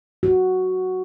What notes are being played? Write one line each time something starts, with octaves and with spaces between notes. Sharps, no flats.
F#4